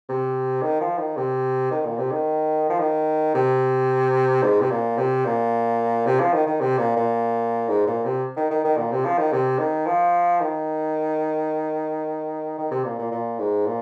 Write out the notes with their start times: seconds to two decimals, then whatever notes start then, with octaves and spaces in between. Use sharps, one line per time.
0.09 C3
0.62 D#3
0.81 F3
0.98 D#3
1.17 C3
1.71 D#3
1.85 A#2
1.98 C3
2.12 D#3
2.69 F3
2.79 D#3
3.34 C3
4.43 G#2
4.61 C3
4.71 A#2
4.98 C3
5.25 A#2
6.06 C3
6.20 F3
6.34 D#3
6.46 D#3
6.61 C3
6.78 A#2
6.96 A#2
7.69 G#2
7.87 A#2
8.05 C3
8.37 D#3
8.51 D#3
8.64 D#3
8.77 A#2
8.92 C3
9.05 F3
9.18 D#3
9.32 C3
9.59 D#3
9.87 F3
10.41 D#3
12.58 D#3
12.71 C3
12.84 A#2
12.99 A#2
13.12 A#2
13.39 G#2
13.66 A#2